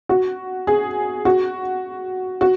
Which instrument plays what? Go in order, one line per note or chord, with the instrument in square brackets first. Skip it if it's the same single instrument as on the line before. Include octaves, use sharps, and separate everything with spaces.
[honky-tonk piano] F#4
G#4
F#4
F#4